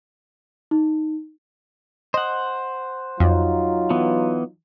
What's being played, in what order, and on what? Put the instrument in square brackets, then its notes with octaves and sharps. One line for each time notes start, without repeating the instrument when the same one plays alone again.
[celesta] D#4
[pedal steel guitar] C5 F#5 [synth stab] D#5
[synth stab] F2 [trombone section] F#3 D#4 F4
[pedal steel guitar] E3 B3